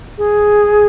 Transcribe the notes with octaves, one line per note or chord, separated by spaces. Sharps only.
G#4